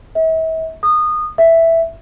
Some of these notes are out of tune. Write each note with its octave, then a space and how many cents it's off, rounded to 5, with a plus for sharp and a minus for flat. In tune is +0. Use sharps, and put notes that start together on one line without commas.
E5 -40
D#6 -20
E5 +0